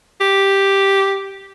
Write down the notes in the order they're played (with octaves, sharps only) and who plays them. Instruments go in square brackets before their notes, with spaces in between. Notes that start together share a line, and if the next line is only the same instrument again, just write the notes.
[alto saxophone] G4